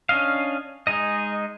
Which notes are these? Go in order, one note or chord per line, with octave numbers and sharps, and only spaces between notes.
C#4 D4 D#5 F5
G#3 D#4 D#5